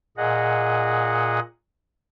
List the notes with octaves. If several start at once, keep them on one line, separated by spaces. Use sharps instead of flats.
A#2 G#4 D#5 F#5